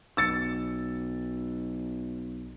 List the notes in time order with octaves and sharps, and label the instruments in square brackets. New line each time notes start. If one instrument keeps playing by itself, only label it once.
[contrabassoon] B1 [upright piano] E6 A6 C#7